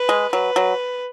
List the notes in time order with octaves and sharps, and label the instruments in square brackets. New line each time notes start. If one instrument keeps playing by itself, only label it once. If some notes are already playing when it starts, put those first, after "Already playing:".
Already playing: [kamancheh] B4
[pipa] G#3
[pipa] F#3 [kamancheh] B4
[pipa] F#3